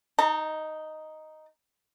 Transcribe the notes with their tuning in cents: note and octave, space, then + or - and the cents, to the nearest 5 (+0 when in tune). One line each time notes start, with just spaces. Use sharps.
D#4 +0 A#5 -45